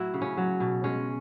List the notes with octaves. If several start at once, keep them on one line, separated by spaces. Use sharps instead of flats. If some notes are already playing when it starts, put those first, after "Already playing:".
Already playing: A2 F#3 E4 F#4
C#3
C#4
F#3
B2
G#3 C#4